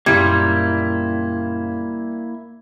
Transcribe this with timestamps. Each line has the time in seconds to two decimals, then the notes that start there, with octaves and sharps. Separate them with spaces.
0.06 F#1 A#2 G3 A#3 E4 C6 G#6